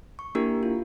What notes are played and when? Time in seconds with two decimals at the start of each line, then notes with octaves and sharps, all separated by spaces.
0.19 C#6
0.35 A#3 D4 E4 G4 A#4
0.63 F4